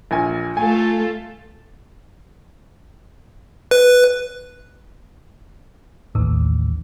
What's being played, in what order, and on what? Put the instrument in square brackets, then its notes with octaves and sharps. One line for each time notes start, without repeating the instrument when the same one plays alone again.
[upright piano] A#1 A#3 G#5
[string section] A3 F4 A4 [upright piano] G#5
[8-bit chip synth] B4
[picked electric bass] A1 [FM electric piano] D#2